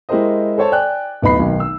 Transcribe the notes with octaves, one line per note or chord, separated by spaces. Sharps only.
G#3 E4 G4 A#4 C5 D#5
A4 C5 C#5 A5
D5 G5 G#5 F#6
D1 B3 D#4 B5 C7
B1 D#3
E6